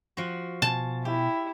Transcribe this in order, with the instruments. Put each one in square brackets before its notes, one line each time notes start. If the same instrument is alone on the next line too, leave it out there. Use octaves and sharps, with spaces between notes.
[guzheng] F3 F#4
[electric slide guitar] B2 C5 G#5 [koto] A5
[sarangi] E4 [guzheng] G4